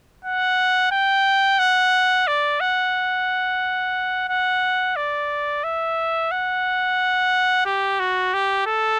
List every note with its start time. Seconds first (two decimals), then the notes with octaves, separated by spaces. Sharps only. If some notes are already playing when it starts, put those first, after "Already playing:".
0.25 F#5
0.92 G5
1.59 F#5
2.27 D5
2.61 F#5
4.29 F#5
4.96 D5
5.64 E5
6.31 F#5
7.66 G4
8.00 F#4
8.34 G4
8.67 A4